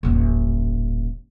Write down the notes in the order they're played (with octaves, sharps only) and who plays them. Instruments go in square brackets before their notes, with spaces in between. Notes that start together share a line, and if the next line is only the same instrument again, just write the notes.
[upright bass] D#1 A1